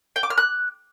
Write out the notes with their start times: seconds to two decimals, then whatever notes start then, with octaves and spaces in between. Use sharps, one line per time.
0.16 G5
0.23 D6
0.30 F6
0.38 F#6